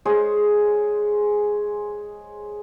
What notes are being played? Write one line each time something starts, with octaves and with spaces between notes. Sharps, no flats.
G#3 G#4 C5 C#5